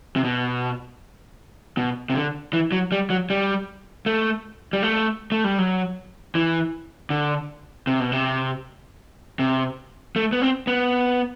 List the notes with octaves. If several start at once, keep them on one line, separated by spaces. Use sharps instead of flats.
C3
B2
B2
C3
D3
E3
F#3
G3
F#3
G3
A3
G3
A3
A3
G3
F#3
E3
D3
C3
B2
C3
C3
A3
B3
C4
B3